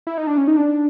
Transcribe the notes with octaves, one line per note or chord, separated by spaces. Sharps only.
E4
D#4
D4
C#4
D#4
D4